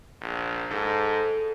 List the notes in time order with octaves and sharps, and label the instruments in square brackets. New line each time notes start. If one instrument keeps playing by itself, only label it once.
[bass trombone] A#1
[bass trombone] G#2 [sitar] A4